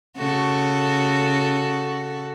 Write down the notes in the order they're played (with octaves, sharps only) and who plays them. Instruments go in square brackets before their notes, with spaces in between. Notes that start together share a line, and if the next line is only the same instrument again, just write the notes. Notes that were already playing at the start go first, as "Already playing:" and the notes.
[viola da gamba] C#3 F#4 A4